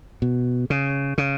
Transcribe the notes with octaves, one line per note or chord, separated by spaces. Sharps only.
B2
C#3
C#3